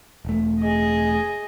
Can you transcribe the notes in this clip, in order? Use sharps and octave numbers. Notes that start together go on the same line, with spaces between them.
E1 A3
G#4 D#5